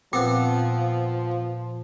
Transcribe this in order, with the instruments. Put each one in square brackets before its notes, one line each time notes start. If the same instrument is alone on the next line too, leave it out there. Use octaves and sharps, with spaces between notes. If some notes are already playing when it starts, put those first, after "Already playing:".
[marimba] A#2 [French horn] F3 [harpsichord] B3 C4